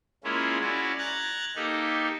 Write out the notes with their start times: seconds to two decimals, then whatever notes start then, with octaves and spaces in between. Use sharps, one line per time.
0.24 G#3 A#3 C#4 E4 F4
0.61 C#4 E4 F#4 D5
0.99 A#5 F#6 G#6 A6
1.56 A#3 D#4 G4 A4